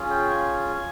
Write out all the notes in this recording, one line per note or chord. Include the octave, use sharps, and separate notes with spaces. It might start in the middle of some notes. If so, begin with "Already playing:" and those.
Already playing: C#4 F4 G#4
G5
G#5